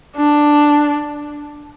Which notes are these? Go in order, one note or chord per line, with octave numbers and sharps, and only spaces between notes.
D4